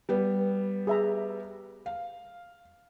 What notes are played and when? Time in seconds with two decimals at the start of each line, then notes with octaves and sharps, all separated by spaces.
0.09 G3 B3
0.87 G#4 E5 A#5
1.86 F5